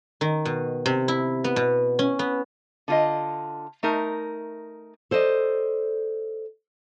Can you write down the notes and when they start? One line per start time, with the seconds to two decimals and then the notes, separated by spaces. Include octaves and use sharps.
0.21 D#3
0.45 B2
0.86 C3
1.08 E4
1.44 B3
1.56 B2
1.99 C#4
2.19 B3
2.88 D3 F4 D#5
3.83 A3 D#4 A#4
5.11 A4 C5 D5 D#5